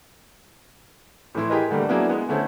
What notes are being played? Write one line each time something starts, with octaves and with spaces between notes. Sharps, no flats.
A2 E3 E4 C6
G4 G#4 A#4 B4 D#5
D3 G3 A3 A#3
F#3 A#3 B3 D4 E4 G#4
G#3 B3
D3 A3 C#4 E4 C5